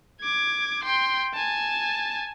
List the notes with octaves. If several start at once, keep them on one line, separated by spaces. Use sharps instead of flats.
D6 G#6
G5 C6
G#5 A5